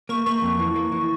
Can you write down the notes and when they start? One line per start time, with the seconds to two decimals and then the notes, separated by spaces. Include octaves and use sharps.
0.09 A#3 C#6
0.26 A#3 C#6
0.42 F2
0.59 E3
0.76 A#3
0.92 E3